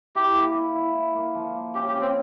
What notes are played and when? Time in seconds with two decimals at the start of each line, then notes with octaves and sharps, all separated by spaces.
0.15 E4 G4
0.35 A#3
0.55 E4
0.75 E4
0.95 E4
1.15 A#3
1.35 F3
1.55 A#3
1.75 C#4 G4
1.88 G4
1.94 C#4
2.01 C4